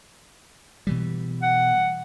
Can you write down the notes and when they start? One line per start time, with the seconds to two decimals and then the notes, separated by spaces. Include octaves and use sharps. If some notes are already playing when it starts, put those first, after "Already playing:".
0.87 B2 E3 G3
1.42 F#5